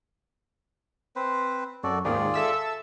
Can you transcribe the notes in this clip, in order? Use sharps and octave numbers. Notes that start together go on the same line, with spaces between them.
C4 B4 C5
F#2 F#4 A4 D5
D#2 G#2 D#3 F4 G#4 D5
A4 E5 E6